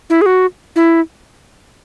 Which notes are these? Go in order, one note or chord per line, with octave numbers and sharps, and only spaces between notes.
E4
G#4
F#4
E4